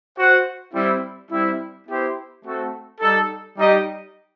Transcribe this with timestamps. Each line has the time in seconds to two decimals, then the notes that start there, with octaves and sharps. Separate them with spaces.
0.18 F#4 C5 F#5
0.74 G3 C4 E4
1.31 G3 C4 E4
1.87 B3 E4 G4 C5
2.44 A3 C4 F#4 A4
3.01 G3 D#4 A4
3.58 G3 D#4 G4 D#5